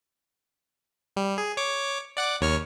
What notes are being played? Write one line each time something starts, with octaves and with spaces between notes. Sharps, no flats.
G3
G#4
C#5 D6
D5 F#5 D6
D#2 C#5 F6